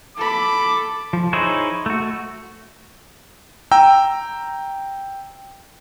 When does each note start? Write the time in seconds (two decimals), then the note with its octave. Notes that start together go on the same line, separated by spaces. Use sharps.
0.17 A4 B5 D6
1.13 F3
1.33 D#4 E4 G#4 C5 C#5
1.86 A3 F#4
3.71 G5 A#5 E6